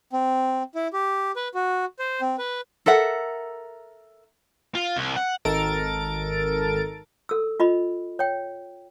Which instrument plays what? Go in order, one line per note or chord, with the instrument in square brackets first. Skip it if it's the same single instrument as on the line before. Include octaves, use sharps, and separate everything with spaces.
[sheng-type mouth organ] C4
E4
G4
B4
F#4
C5
C4
B4
[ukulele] A4 A#4 E5 F#5
[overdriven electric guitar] F4
C2
F#5
[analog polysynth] G#1 D#3 A4 A#4 A6 D7
[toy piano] A4 E6
F4 D#5 B5
C#5 G5